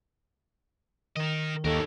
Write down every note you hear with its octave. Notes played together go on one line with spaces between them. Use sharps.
D#3 A#4 D#5
D#2 C#4 A4 A#4